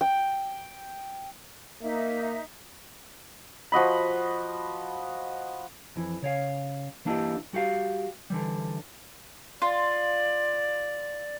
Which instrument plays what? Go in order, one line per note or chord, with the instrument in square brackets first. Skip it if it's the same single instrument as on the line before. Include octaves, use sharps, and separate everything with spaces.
[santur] G5
[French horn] A#3 [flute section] D#4 E5
[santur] F3 F#4 D#5 B5
[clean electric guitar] F2 E3
C#3 C#5 F5
E3 A#3 D4 E4 G4 D#5
G3 F#4 G4 F5
D3 E3 G3
[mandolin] F4 [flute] D5